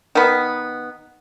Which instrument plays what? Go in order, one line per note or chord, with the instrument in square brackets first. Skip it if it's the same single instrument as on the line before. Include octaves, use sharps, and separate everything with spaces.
[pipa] D#3 B3